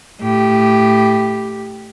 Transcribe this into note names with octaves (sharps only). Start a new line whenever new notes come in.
A2 G4